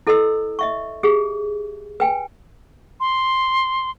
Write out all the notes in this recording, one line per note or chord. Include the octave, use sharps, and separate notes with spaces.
E4 A4 B4 D#5 C6 E6
D#5 E5 C#6
G4 G#4
B4 G5 G#5
C6